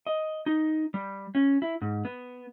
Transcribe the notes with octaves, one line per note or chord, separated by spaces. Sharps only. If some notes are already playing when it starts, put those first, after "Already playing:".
D#5
D#4
G3
C#4
E4
G#2
B3